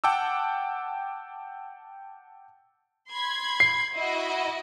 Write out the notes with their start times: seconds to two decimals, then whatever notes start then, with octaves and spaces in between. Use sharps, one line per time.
0.04 F#5 G5 A5 D6 E6
3.13 B5 C6 G#6
3.60 C7
3.95 E4 F#4 D#5